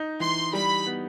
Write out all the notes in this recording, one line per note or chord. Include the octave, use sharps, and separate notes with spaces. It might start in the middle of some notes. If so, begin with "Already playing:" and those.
Already playing: D#4
E3 C6
G3 B5
B3